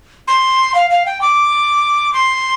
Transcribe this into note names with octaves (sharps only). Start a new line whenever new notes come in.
C6
F5
F5
G5
D6
C6